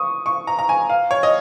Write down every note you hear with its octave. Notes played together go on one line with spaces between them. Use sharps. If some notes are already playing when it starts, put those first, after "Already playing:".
Already playing: C#6 D#6
C#6
A#5
A#5
G#5
F5
C#5
D#5